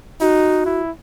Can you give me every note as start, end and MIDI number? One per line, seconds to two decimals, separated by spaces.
0.20 0.63 63
0.20 0.81 66
0.65 0.91 64